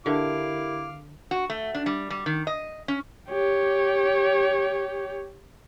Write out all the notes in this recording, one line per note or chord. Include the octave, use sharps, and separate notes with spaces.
D3 E4 G4 A#4 E5 F5 D6
F#4
A3
D4
G3
G3
D#3
D#5
C#4
G4 C#5